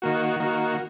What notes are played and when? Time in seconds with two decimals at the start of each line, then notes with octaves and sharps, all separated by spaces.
0.02 D#3 A#3 F#4
0.40 D#3 A#3 F#4